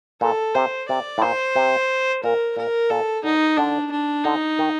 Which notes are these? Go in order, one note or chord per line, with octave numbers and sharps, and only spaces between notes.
A#2 A4
C3 C5
C3 D5
A2
A#2 C5
C3
A#2 A#4
A#2 A#4
A#2 A4
D3 D#4
D3 D4
D4
D3 D#4
D#3